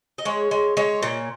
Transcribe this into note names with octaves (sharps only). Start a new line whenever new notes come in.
D#5
G#3 C#5
G#3
G#3 C#5
A#2